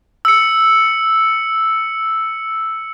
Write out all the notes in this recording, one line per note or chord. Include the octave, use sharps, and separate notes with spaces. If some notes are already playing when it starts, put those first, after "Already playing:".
E6 C#7